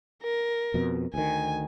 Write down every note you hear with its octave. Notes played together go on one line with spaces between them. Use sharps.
A#4
F2 B2
D2 D#3 G#5